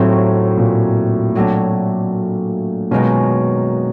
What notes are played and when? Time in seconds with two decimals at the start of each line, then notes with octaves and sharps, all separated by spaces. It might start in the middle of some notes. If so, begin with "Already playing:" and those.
Already playing: D#2 A2 D#3 F#3 A3 C4
0.58 A#2
1.35 A2 F#3 A3 D4
2.91 F#2 B2 D#3 G#3 C#4 F4